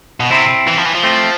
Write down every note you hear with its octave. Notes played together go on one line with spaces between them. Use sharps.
B2
C3 C4 E4
E3
F3
E3
F3
A3 C4